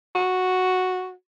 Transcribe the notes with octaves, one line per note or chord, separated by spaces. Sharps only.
F#4